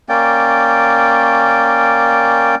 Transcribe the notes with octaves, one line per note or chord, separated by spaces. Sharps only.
A#3 C#4 D5 G5